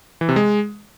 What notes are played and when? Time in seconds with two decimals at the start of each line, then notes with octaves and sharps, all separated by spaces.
0.21 E3
0.29 C3
0.36 G#3